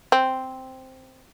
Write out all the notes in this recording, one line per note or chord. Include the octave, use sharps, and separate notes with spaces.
C4